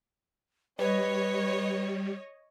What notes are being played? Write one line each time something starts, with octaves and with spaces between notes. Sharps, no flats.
G3 B4 C#5 D#5